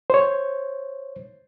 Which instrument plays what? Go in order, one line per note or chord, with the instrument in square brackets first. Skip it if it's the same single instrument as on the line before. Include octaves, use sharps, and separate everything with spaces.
[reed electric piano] C5 C#5